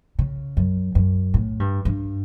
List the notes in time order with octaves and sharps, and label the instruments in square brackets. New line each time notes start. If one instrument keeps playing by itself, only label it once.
[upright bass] C#3
F#2
F#2
A2
G2
G2